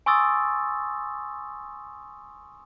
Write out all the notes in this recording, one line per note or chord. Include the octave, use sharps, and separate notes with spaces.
G#5 C6 C#6 D#6 E6 A6